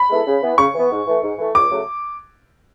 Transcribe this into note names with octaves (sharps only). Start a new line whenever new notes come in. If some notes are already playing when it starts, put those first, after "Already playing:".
Already playing: B5
G#3 B3 E4 A4
C#3
E3 B3
C#3 C#6
E3 B3
G#2
E3 A3
G#2
E3 A3
C#2 D6
C#3 F#3 A3